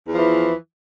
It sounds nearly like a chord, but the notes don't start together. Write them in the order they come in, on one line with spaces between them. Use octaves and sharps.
E2 F3 E3